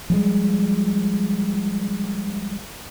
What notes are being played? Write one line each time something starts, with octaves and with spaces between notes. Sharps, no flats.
F3 G3 G#3